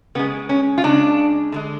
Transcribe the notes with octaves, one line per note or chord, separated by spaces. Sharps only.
C#3 G#3 B3
C#4
F4
C#3 G#3 D4
D3 G#3